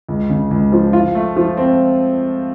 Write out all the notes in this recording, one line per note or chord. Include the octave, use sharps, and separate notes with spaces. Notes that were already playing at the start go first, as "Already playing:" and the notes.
C#2
C#3
C#2
F3
F4
A3
F3
C4